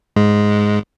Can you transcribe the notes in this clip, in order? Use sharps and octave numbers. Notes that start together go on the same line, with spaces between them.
G#2 G#3